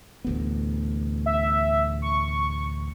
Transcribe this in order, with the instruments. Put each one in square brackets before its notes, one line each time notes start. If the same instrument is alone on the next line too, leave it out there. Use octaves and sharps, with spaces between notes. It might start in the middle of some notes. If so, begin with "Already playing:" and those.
[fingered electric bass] A1 D2 B3
[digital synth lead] E5
C#6